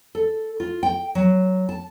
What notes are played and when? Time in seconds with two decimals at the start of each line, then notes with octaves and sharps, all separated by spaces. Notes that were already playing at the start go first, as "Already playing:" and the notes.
0.15 A4
0.60 F4
0.83 G5
1.15 F#3
1.69 A5